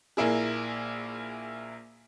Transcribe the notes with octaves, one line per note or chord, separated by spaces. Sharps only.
A#1 A#3 E4 G#4